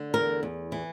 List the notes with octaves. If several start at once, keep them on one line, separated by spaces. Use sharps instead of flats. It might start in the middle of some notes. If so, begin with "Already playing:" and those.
Already playing: D3
E2 A#4
E2
E3